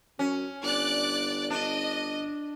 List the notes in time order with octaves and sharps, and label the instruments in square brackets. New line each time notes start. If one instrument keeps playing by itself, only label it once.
[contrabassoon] F#2 [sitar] C#4
[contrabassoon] G1 [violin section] D5 D6 F#6
[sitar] D4 [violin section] D#5